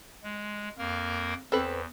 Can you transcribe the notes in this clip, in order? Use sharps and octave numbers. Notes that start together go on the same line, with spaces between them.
G#3
F2 A#3 A#4
E2 C4 A4 B4